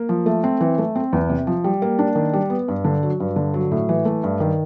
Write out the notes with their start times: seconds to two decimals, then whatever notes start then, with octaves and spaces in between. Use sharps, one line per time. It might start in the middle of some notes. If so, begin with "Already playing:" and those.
Already playing: A#3
0.09 F3
0.26 A3
0.44 C4
0.61 E3
0.78 A3
0.96 C4
1.13 E2
1.29 C3
1.47 F3
1.64 G3
1.82 A#3
1.99 D4
2.15 D#3
2.33 G3
2.50 B3
2.68 G2
2.84 D3
3.03 F#3
3.20 G2
3.36 D3
3.54 F#3
3.71 A2
3.89 E3
4.05 A3
4.24 G2
4.40 D#3